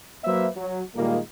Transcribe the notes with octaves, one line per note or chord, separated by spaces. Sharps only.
F#3 A#3 B4 C5 E5
F#3
A#2 D#3 G3 G#3 A#3